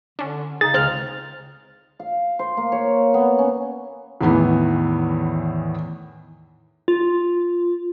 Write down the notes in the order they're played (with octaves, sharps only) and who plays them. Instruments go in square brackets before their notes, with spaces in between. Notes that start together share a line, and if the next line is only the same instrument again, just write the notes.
[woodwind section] D3 [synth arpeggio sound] C#4 D4
[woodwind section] C#3 D#4 [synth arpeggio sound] G#4 [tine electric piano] A6
[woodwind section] C#2 C#3 F6 [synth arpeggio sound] C4 C5 F#6
[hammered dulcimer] F5
C5
A#3
C#5
B3
C#4
[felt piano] E2 A2 D#3 E3 B3
[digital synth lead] F4